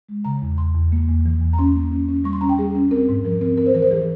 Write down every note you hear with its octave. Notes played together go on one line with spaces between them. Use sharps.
G#3
C#3 A#5
E2
E2 C6
E2
A#3
E2
E3
E2
A#5
C#4 C6
A#3
C#4
C#4
G3 C#6
C6
C#4 A#5
G5
G3 G#4
C#4
C4 A#4
G#2
F3 A#4
C4 A#4
C4 A#4
C5
E3 A#4
C5
E3 G#4